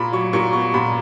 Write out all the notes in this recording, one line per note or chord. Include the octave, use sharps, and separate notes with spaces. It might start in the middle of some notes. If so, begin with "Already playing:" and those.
Already playing: A#2 B5
F#3 C#6
A#2 C#6
B3 C#6
A#2 B5